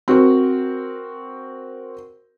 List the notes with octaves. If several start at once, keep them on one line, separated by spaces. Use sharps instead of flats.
C4 F#4 A#4 C5